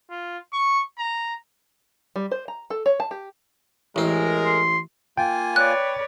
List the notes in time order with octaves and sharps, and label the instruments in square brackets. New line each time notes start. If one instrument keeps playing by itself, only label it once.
[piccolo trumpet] F4
C#6
A#5
[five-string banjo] G3
C5
A#5
A4
C#5
A5
G4
[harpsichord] A1 C4 [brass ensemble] G#3 A#4
[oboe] C6
[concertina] A#3 F4 G#5 [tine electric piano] G5
[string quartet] B4 C#5 D5 [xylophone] F#6